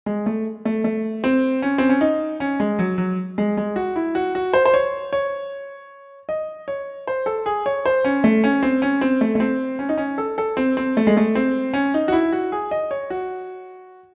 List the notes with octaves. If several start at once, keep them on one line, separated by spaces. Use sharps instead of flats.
G#3
A3
A3
A3
C4
C#4
C4
C#4
D#4
C#4
G#3
F#3
F#3
G#3
G#3
F#4
E4
F#4
F#4
C5
C5
C#5
C#5
D#5
C#5
C5
A4
G#4
C#5
C5
C#4
A3
C#4
C4
C#4
C4
A3
A3
C4
C#4
D#4
C#4
A4
A4
C4
C4
A3
G#3
A3
C4
C#4
D#4
F#4
E4
F#4
G#4
D#5
C#5
F#4